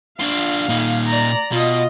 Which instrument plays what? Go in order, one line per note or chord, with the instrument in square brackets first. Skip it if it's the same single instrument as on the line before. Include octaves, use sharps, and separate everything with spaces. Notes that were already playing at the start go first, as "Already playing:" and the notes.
[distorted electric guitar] D4 F4 [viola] F5
[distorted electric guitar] A#2 D#4
[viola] D5 A#5
[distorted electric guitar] B2 [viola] F4 D#5